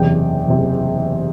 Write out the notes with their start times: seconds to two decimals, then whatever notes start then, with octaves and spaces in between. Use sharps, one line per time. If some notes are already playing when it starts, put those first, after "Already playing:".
Already playing: F#1 E2 C3 G5
0.48 F#1 C3